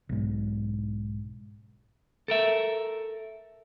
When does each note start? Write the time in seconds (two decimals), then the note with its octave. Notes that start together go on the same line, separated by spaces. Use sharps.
0.09 B1 G#2
2.28 A4 A#4 E5